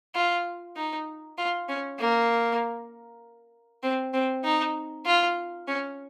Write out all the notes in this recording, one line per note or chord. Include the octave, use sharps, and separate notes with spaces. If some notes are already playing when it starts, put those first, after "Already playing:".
F4
D#4
F4
C#4
A#3
C4
C4
D#4
F4
C#4